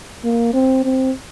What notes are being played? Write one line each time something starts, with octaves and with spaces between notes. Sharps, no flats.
A#3
C4
C4